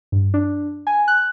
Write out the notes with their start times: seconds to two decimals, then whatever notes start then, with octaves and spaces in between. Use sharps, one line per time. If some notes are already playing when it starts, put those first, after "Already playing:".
0.12 G2
0.34 D4
0.87 G#5
1.08 F#6